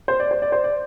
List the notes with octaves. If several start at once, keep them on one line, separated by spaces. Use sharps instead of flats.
C5
D5
C5
D5
C5
D5